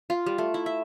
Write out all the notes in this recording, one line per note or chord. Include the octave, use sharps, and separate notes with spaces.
F4
G3
A3
E4
E5